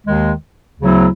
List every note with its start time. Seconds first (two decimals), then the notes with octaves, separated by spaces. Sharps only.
0.06 D#2 D#3 G#3
0.80 D2 C#3 F#3 B3 E4